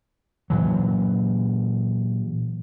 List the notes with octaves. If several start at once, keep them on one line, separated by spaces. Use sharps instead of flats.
A#2 E3 F#3